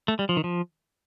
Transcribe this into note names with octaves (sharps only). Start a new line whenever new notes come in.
A3
G3
F3
D#3
F3